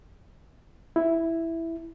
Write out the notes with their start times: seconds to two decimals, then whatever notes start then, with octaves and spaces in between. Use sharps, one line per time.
0.96 E4